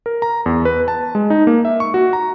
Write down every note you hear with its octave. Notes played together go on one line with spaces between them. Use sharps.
A#4
A#5
E2
B4
A5
G#3
D#4
A#3
E5
C#6
F#4
A#5